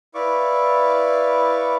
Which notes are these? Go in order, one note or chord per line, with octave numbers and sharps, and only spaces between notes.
E4 B4 D5 F5 C#6 D6